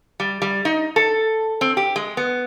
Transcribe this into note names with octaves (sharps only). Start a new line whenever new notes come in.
G3
G3
D#4
A4
C4
G4
G#3
B3